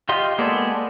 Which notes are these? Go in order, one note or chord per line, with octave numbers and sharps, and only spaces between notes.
F4 G4 D#5 C6
G#3 A#3 B3 A4 D5